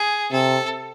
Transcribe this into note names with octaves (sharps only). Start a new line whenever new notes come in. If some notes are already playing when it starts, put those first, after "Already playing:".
Already playing: G#4
C3 A4